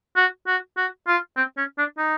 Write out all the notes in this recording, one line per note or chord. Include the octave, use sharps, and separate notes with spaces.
F#4
F#4
F#4
F4
C4
C#4
D4
D#4